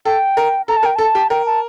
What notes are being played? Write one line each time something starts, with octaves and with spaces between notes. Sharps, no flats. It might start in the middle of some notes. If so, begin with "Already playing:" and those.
A4 G5
A#4
A4 A#5
A5
A#4
G5
A4 A5
G4
A#4 G5
A5